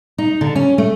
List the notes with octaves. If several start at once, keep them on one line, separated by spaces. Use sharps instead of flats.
D#4
D3
C#4
A3